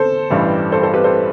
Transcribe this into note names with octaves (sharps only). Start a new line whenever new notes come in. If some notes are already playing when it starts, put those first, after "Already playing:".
Already playing: E2 D3 A4 C5
A1 G2 E3 G3
A4 C5
A4 C5
G4 B4
A4 C5